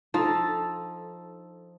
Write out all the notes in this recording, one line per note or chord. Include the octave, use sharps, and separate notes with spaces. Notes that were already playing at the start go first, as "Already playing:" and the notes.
F3 D#4 A4